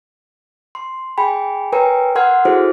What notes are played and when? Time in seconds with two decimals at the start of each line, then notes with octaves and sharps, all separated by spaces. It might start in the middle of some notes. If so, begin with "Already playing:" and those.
0.75 C6
1.18 G#4 G5 G#5 B5
1.73 A#4 B4 C#5 G5 G#5 A#5
2.16 A#4 F#5 C6 F6 G#6
2.45 E4 F#4 G#4 A4 C5